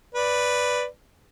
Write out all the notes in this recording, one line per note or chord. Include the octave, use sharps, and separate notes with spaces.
B4 D5